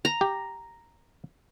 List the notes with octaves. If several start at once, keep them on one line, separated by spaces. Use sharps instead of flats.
A#5
G4